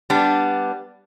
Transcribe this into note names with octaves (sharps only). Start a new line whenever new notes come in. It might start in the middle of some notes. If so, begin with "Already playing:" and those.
G3 B3 D4